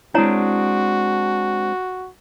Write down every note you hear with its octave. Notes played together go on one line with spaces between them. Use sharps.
G#3 C4 D4 E4 F#4 C#5 A#5